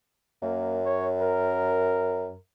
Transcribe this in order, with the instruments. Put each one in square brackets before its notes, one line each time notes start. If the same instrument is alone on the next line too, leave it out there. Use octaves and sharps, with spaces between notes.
[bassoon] F#2 [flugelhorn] A#3
[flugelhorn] C#5
A#4